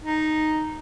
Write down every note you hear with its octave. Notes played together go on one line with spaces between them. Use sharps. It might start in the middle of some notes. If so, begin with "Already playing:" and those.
D#4